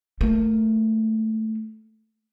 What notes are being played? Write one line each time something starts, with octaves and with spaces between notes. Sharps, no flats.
A3 A#3